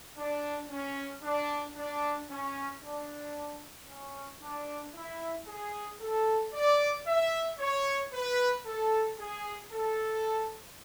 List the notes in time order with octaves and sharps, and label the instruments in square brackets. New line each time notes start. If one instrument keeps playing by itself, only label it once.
[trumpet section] D4
C#4
D4
D4
C#4
D4
C#4
D4
E4
G#4
A4
D5
E5
C#5
B4
A4
G#4
A4